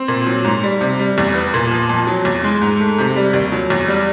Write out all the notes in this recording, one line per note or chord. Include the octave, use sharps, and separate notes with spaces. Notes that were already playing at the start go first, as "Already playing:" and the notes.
Already playing: C4
A#2
F#3
G#2
G3
C3
G3
E2
B3
A#2
F3
F2
F#3
E2
G#3
G#2
A3
C3
G3
D#2
F#3
E2
G3